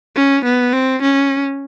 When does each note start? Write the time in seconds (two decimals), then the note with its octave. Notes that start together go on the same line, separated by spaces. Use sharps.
0.16 C#4
0.44 B3
0.73 C4
1.02 C#4